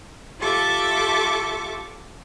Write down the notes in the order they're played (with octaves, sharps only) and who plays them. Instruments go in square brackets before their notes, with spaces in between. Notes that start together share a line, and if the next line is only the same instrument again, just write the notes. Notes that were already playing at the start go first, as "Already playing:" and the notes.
[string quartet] F4 G4 A4 E5 C#6 D6